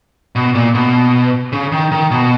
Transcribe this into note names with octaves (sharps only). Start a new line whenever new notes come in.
B2
A#2
B2
C#3
D#3
D#3
B2